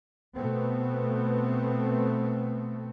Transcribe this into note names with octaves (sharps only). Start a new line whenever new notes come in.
B2 A3 B3 C4